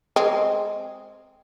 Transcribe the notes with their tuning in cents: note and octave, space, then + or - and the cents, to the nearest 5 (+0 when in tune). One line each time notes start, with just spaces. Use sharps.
G#3 +0 C4 +0